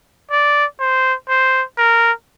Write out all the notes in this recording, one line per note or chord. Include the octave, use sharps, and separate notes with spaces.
D5
C5
C5
A#4